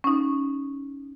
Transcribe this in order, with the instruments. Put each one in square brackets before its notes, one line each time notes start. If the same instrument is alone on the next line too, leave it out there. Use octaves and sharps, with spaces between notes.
[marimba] C#4 D#4